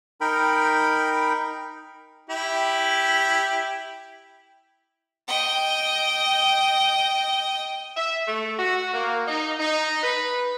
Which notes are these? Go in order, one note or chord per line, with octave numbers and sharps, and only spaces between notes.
D#4 A#4 G5 B5
E4 G4
D#5 G5
E5
A3
F#4
A#3
D#4
D#4
B4